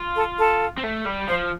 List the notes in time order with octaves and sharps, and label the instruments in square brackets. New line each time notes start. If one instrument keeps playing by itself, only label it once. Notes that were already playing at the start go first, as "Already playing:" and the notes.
Already playing: [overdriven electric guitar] F4
[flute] A4
A4
[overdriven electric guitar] C4
A3
G3
[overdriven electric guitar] F3 [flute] C5